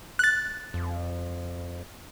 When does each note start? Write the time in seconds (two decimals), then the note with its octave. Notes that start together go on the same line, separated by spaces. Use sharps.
0.19 F#6 A6
0.74 F2